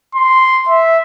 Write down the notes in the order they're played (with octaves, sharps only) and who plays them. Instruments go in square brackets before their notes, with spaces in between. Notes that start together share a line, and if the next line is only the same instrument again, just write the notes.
[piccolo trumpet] C6
E5